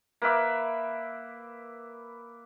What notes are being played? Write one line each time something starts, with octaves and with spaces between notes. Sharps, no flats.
A#3 B4 E5 D6